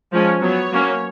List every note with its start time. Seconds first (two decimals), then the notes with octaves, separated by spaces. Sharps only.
0.12 F3 G#3 C#4
0.41 F#3 B3 C#5
0.72 F#3 A#3 C#4